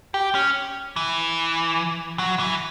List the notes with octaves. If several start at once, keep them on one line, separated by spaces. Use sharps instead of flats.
G4
C#4
E3
F#3
E3